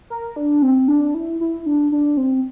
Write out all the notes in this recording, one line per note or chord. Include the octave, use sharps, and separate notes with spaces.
A#4
D4
C4
D4
E4
E4
D4
D4
C4